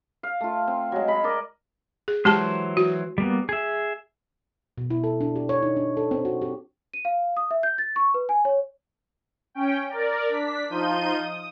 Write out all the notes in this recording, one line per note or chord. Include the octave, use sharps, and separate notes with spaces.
F5
A3 F4
C4
F#3 G#3
G#3 B5
A#4 D5 D#5
G#4
E3 F#3 G#3 G4 C5 A5
F#4
G3 A#3 B3
G#4 E5
B2
E4
A4
D4
G4
C#5
D#4
D4
A4
C4
F#4
G4
D#7
F5
D#6
E5
G6
A6
C#6
B4
G#5
C#5
C#4 G5
A#4 D5
D4 B6
F3 D#4 F4 G6 D#7
D#6